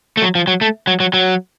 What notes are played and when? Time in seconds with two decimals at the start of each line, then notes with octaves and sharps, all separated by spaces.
0.17 A3
0.22 F#3
0.35 F3
0.47 F#3
0.61 A3
0.87 F#3
1.00 F#3
1.14 F#3